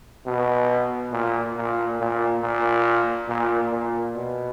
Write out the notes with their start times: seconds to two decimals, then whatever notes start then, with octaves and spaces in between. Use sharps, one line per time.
0.26 B2
1.12 A#2
1.57 A#2
2.00 A#2
2.42 A#2
3.28 A#2
3.71 A#2
4.15 B2